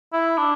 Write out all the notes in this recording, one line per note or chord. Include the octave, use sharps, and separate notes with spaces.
E4
D4